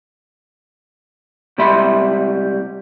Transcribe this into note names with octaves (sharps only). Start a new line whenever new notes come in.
C3 G3 G#3 E5 B5 C6